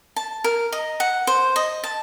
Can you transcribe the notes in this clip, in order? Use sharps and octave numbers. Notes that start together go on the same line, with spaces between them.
A5
A#4
D#5
F#5
C5
D#5
A5